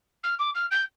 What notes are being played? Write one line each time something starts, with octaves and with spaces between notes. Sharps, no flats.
F6
D6
F6
G6